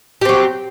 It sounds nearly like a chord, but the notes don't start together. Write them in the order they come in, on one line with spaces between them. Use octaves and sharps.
G4 C4 F#3